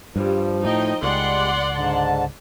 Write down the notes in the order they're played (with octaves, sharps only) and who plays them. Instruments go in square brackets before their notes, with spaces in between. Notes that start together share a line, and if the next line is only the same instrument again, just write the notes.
[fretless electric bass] G2 [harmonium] F3 [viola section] G3
[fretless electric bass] A2 [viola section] D#4 D#5 G5
[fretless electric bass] C#2 [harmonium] G3 G#3 G4 [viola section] D5 F#5 C6
[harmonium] G#2 D3 A5